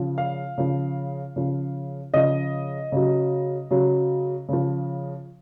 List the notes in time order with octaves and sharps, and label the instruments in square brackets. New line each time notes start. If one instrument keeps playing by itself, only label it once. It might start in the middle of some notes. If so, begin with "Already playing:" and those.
Already playing: [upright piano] C#3 F3
F5
C#3 F3
C#3 F3
C#3 F3 D#5
C#3 F#3
C#3 F#3
C#3 F3